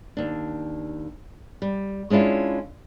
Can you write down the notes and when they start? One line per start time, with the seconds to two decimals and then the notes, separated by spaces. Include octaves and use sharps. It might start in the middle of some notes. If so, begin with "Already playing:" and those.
0.17 D#2 D4
1.62 G3
2.10 G#3 C#4 D4 E4 F4